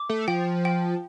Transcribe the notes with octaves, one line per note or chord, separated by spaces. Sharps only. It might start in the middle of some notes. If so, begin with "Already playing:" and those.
Already playing: D6
A3
F3 G5
G5